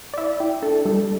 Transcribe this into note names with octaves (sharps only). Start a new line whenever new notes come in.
D5
E4 E5
E4 G5
D4 A4
G3 A4